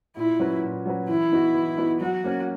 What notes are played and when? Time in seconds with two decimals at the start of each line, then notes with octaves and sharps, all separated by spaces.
0.16 A#2 E4
0.39 F#3 C#4 F#4 B4
0.63 A#2
0.86 F#3 C#4 F#4 B4
1.09 E3 E4
1.32 B3 D#4 F#4
1.55 E3
1.78 B3 D#4 F#4
2.01 F#3 F#4
2.24 A#3 C#4